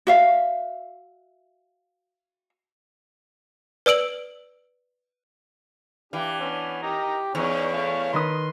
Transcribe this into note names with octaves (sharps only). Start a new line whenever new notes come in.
F#4 E5 F5
B4 D5 E6 D7 F#7
E3 D4 G4 F5
B3 C#4
G4 A#4 D#5 A#5
E2 C#4 D#4 C#5
A3 C#4 F5
D#3 B4 C6 D#6